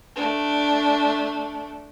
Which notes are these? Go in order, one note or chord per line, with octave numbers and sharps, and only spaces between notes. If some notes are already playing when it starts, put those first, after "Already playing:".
A3 D4